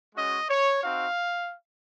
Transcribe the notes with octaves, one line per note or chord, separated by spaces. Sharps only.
G#3 C#4 F#4 D#5
C#5
C4 D#4 F#4 F5